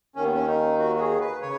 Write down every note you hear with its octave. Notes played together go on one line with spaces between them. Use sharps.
D#2 D#3 C#4
B3
C#4
D#4
F#4
F#4
G#4
B4
C#3 C#5